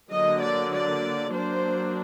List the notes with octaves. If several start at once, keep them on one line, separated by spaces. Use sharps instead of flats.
D3 F#3 A#3 D#5
D5
D5
F#3 A#3 D4 C5